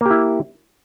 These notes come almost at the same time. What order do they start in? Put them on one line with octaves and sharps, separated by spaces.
A#3 G4 E4